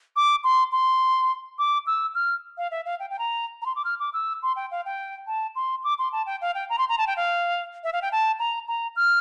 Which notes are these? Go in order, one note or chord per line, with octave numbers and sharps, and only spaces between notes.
D6
C6
C6
D6
E6
F6
F5
E5
F5
G5
G5
A#5
A#5
C6
D6
F6
D6
E6
C6
G5
F5
G5
A5
C6
D6
C6
A5
G5
F5
G5
A#5
C6
A#5
A5
G5
F5
E5
F5
G5
A5
A#5
A#5
F6